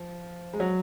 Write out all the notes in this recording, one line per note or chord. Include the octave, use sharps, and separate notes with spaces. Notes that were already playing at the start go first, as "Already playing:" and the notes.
Already playing: F3
G#3
F#3